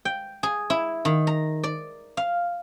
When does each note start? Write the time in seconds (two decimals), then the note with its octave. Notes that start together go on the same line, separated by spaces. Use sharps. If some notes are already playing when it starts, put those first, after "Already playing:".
0.05 G5
0.43 G#4
0.70 E4
1.05 D#3
1.27 A#5
1.63 D5
2.17 F5